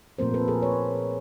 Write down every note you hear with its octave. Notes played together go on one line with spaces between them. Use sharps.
A#2 F3 A3 C4 A#4 C5
A4 B4
G#4 A#4
B4 C#5